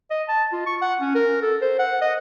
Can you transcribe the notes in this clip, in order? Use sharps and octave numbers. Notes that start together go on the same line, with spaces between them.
D#5
A5
F4
C#6
F#5
C#4
A#4
A4
C5
F#5
D#5